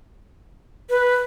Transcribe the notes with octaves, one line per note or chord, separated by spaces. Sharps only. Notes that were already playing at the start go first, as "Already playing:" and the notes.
B4